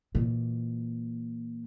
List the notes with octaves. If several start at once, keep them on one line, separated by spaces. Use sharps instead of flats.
A#2 E3